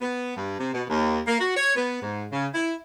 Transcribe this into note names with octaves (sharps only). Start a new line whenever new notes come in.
B3
G2
C3
B2
D#2
A#3
F#4
C#5
B3
G#2
C#3
E4